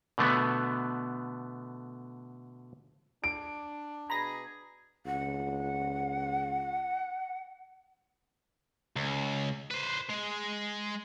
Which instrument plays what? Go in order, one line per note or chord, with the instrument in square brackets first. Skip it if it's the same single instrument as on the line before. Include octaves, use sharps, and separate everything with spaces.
[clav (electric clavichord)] B2 D3 A3 B3
[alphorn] D4 [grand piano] D7
[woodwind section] B2 G#4 [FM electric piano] A#5 B5 A#6
[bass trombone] C#2 [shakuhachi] F#5
[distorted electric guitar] C#2
B4 C5
G#3